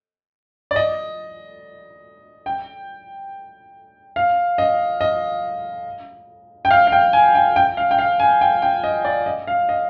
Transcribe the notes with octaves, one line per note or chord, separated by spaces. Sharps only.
D5
D#5
G5
F5
D#5
D#5
G5
F5
F5
G5
G#5
G5
G5
F5
G5
F5
G#5
G5
G5
D#5
D5
D#5
F5
D#5